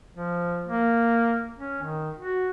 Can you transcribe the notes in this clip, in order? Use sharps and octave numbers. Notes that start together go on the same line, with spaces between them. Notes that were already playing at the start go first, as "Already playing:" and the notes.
F3
A#3
C#4
D#3
F#4